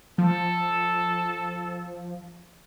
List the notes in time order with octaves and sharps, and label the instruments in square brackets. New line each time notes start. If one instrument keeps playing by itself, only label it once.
[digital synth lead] F3 [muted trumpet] A4